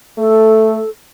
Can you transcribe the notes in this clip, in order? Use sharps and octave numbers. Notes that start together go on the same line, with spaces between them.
A3 A4